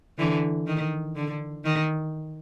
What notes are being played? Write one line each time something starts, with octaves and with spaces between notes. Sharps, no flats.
D3 E3
D#3
D3
D#3